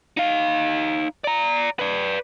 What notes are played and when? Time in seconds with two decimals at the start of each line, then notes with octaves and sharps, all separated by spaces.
0.17 D#4 F5
1.24 D5 A#5
1.79 B4 D5